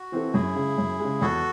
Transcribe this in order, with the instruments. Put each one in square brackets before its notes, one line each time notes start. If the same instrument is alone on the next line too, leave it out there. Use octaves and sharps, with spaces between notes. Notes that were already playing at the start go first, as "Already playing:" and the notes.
Already playing: [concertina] F#4
[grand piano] E3 C4 E4 A4
[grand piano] F#2 [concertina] E4 G#4
[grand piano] C#3 G#3
F#2
C#3 G#3
[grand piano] E2 [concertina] F#4 A4